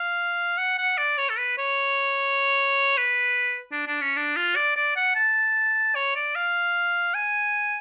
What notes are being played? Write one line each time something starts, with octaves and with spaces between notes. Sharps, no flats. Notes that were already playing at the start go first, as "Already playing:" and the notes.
Already playing: F5
F#5
F#5
D5
C#5
A4
B4
C#5
B4
D4
D4
C#4
D4
F4
D5
D5
F#5
A5
C#5
D5
F5
G#5